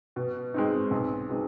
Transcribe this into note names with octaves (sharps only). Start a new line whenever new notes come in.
B2
G#3 C4 D#4
B1
B2 G#3 C4 D#4